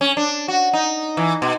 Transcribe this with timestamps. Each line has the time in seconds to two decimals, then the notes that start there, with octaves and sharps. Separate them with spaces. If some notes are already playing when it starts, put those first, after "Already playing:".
0.01 C#4
0.17 D4
0.48 F#4
0.73 D#4
1.17 E3
1.42 B2